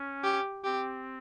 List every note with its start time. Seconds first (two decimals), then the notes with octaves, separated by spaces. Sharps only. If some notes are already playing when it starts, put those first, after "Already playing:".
Already playing: C#4
0.23 G4
0.64 C4 G4